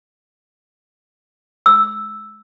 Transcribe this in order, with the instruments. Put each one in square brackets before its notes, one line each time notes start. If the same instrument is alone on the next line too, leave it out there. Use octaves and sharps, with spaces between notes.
[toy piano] E6